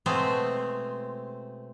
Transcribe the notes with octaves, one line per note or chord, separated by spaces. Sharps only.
B2 G#3 A3 C4 C5